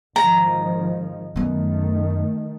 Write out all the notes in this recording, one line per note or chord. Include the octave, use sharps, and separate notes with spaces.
G#1 D#3 F3 A#5
F#2 D#3 A3 B3